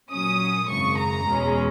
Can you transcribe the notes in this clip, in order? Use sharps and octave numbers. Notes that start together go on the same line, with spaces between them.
A#2 F#3 C#4 D#6
G#1 F#2 C#3 C#6
A#5
E2 B2 G#3 C#4